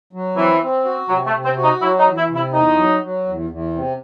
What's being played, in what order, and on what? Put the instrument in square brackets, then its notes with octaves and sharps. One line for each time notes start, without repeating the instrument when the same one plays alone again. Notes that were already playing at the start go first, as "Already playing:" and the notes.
[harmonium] F#3
[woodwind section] E3 [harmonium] C4
[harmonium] C4
F#4
[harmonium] C3 [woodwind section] F#3
[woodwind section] A3
[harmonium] C3
[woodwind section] C4
[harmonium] F#4
[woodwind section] D#4
[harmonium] F#3 [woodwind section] E4
[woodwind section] D#4
[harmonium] E2
[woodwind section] E4
[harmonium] C3
[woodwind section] E4
[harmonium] E2 [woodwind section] D#4
[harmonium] F#3
F#3
E2
E2
C3